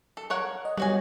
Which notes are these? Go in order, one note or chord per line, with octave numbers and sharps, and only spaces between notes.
A4
A#4 C#5 F#5
D#5
G3 B3 F#4 C#5 G#5